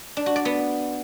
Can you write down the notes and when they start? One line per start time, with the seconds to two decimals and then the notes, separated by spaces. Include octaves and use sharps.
0.17 D4
0.26 F#4
0.36 D5
0.45 B3